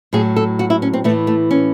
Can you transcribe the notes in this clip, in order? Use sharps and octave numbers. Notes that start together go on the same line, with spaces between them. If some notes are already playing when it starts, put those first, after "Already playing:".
A2 F#3 G#4
A4
F#4
E4
C#4
C4
A2 E3 A3
A3
C#4